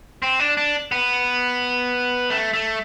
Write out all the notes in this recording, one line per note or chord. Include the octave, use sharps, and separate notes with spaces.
C4
D4
D4
B3
A3
A3